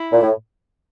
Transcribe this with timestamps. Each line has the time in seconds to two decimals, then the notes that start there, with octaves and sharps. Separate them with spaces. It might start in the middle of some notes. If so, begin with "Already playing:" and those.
Already playing: E4
0.12 A#2
0.21 A2